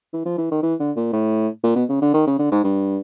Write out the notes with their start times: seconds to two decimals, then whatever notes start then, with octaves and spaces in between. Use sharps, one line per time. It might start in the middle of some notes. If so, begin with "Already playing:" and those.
0.13 E3
0.25 F3
0.38 E3
0.51 D#3
0.63 E3
0.80 D3
0.97 A#2
1.13 A2
1.64 A#2
1.76 B2
1.89 C#3
2.02 D3
2.14 D#3
2.27 C#3
2.39 D3
2.52 G#2
2.64 G2